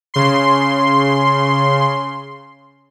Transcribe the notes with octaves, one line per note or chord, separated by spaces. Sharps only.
C#3 C6